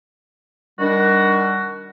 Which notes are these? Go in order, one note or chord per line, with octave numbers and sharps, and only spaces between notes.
D#3 G3 D4 F#4